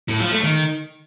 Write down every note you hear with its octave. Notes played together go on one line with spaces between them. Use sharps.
A2
F3
A3
D#3